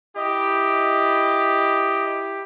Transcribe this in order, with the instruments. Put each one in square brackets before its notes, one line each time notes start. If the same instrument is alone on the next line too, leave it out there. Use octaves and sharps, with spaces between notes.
[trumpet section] E4 G4 [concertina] D#5